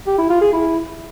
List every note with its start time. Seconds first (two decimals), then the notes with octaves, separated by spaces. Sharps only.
0.07 G4
0.18 E4
0.30 F4
0.41 G#4
0.53 E4